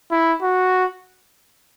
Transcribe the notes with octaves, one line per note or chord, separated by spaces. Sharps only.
E4
F#4